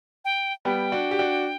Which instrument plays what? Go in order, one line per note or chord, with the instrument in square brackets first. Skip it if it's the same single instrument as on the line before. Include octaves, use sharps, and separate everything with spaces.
[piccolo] G5
[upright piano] G3 B3 [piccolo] G5
[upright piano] D4 F#4
G4
D4 F#4